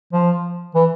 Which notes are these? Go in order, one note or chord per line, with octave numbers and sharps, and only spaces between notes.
F3
E3